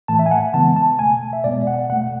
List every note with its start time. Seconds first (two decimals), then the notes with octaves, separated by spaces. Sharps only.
0.08 A2 E3 A3 A5
0.19 E5
0.26 G#5
0.31 F#5
0.54 C#3 E3 G#3 B3 A5
0.76 A5
0.99 B2 A3 G#5
1.33 E5
1.44 B2 G#3 B3 D5
1.67 F#5
1.90 B2 A3 F#5